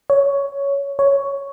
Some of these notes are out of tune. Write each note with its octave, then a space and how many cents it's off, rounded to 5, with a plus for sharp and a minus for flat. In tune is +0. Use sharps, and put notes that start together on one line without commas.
C#5 +10
C#5 +5